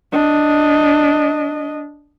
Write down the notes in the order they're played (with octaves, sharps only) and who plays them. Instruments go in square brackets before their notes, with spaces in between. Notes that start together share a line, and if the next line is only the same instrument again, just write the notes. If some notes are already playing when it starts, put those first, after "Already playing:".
[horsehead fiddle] D4 D#5